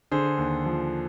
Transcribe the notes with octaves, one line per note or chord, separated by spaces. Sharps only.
D3 G#4 C5
D#2
F3